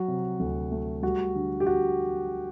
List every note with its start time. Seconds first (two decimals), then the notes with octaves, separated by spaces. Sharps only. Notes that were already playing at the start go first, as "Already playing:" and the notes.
Already playing: F#3 F#4
0.08 C3
0.39 D2
0.72 A3
1.03 G3 F#4
1.35 D3
1.60 G4
1.66 F#4